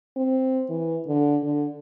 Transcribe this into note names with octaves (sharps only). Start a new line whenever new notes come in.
C4
E3
D3
D3